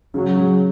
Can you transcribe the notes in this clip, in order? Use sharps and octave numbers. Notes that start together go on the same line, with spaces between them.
C#3 F#3
G#3